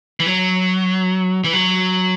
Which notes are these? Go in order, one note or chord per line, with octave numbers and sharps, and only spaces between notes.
E3
F#3
E3
F#3